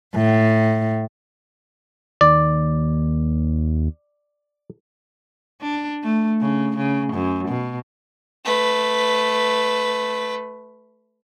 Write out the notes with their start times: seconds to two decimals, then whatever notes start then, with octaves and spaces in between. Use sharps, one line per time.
0.15 A2
2.21 D#2 D5
5.62 D4
6.03 A3
6.41 C#3
6.77 C#3
7.13 F#2
7.48 B2
8.45 A3 B4